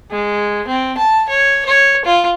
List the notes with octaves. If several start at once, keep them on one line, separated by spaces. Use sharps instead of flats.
G#3
C4
A5
C#5
C#5
F4